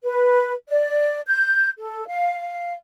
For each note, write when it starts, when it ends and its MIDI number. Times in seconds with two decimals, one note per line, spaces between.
0.03 0.52 71
0.68 1.20 74
1.27 1.67 91
1.77 2.07 69
2.07 2.74 77